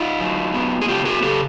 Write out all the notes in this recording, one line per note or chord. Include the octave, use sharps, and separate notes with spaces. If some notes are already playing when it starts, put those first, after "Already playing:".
Already playing: D#4 F4
F#3
B3
G#4
C#3 F4 G4
F#4 G#4
C#3 G4 A4